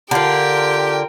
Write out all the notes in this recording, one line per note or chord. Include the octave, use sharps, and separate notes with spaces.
D3 F4 G4 A#4 G5